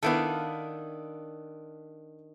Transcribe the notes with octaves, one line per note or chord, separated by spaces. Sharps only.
D#3 B3 D4 E4 A4 F5